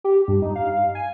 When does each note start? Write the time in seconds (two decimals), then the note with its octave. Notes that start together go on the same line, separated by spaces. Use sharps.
0.04 G4
0.28 G2
0.42 D#4
0.56 F5
0.95 G#5